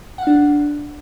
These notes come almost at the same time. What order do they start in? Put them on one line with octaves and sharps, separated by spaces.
F#5 F5 D4